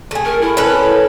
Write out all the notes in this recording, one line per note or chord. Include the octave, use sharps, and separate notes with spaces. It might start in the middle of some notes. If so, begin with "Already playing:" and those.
A3 G#4
A#4
E4
C#4 A4 B4